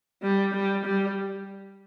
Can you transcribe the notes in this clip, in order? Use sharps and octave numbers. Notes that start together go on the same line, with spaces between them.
G3
G3
G3